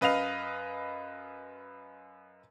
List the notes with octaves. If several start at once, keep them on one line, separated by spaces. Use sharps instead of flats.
F#2 B4 D#5 F5 F7